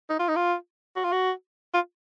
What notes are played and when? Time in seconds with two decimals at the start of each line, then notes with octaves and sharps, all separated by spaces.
0.10 D#4
0.19 F4
0.28 D#4
0.36 F4
0.96 F#4
1.04 F4
1.12 F#4
1.74 F4